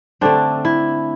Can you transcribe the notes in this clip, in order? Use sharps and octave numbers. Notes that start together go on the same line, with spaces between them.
D3 A3 C4 D4
E4